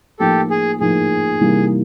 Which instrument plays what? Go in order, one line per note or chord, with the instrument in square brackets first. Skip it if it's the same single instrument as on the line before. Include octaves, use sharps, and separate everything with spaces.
[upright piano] A2 F3 A#3 D#4 [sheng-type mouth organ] G4 A4
[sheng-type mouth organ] G#4
[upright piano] A2 F3 A#3 D#4 [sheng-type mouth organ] G#4
[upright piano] C3 E3 G3 A#3 D#4